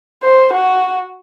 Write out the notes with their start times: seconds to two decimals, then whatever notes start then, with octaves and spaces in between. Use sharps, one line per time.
0.23 C5
0.53 F#4